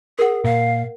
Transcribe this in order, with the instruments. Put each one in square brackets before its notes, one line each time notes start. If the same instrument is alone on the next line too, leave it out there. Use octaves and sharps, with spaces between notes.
[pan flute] G#4 [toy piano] A#4 F#5
[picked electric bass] A#2 [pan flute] F5